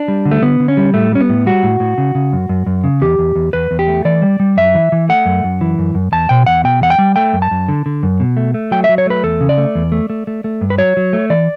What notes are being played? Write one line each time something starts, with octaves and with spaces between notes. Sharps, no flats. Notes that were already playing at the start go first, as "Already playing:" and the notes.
Already playing: D4
G3
D3
A3
D3 B3
D3
C#4
G3
A2 A3
G3 C#4
B3
A2
G3 F#4
A2
A2
C#3
C#3
F#2
F#2
F#2
C#3
E2 G4
E2
E2
E2 B4
E2
G4
A3
E3 D5
G3
G3
F#2 E5
E3
E3
A3 F#5
F#2
F#2
E3
F#2
F#2
E2 A5
B2 G5
E2 F#5
B2 G5
E2 F#5
G5
G3
A3 G5
F#2
A5
F#2
D3
D3
F#2
B2
A3
A3
F#3 G5
E5
F#3
C#5
A3 B4
E2 A4
C#3
D5
A3
E2
A3
A3
A3
A3
G2
B4
F#3 C#5
F#3
A3
E3 D5